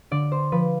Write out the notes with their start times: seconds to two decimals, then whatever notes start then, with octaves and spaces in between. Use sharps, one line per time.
0.11 D3 D5
0.32 C5
0.52 F3 B4